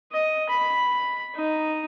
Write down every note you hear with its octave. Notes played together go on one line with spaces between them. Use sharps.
D#5
B5
D#4